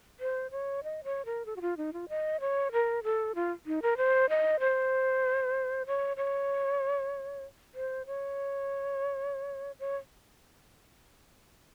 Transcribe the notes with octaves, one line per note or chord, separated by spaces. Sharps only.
C5
C#5
D#5
C#5
A#4
A4
F#4
F4
D#4
F4
D#5
C#5
A#4
A4
F4
D#4
A#4
C5
D#5
C5
C#5
C#5
C5
C#5
C#5